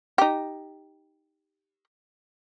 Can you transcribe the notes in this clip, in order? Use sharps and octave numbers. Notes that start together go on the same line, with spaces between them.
D#4 G4